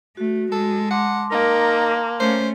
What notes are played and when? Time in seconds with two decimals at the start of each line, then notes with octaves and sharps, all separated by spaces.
0.17 A3 F#4
0.52 G#3 A4
0.90 F#5 A5 C6 D6
1.32 A#3 D#4 A#4
2.20 A3 C#4 C5